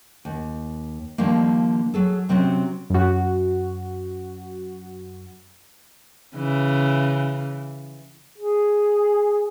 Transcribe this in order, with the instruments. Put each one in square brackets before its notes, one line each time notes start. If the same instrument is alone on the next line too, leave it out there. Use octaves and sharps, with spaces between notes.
[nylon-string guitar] D#2
D3 D#3 F3 G3 A#3
F#3 G#4 A4
C3 F#3 C4 C#4 F#4
[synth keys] F#2 F#4
[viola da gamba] C#3 E3
[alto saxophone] G#4